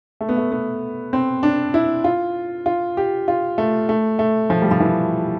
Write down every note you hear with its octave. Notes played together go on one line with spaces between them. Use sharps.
A3
B3
A3
B3
C4
D4
E4
F4
F4
G4
F4
A3
A3
A3
F3
G3
F3
E3